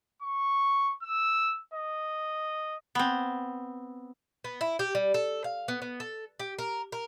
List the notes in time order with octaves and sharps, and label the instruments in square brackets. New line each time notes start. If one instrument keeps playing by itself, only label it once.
[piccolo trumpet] C#6
E6
D#5
[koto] B3 C4
[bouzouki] B3
E4
G4
G3
A4
F5
B3
B3
A4
G4
A#4
A#4